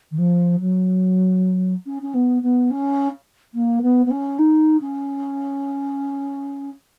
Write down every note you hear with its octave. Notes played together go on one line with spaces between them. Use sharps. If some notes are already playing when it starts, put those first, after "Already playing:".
D#3
F3
F#3
C#4
C#4
B3
B3
C#4
A#3
B3
B3
C#4
D#4
C#4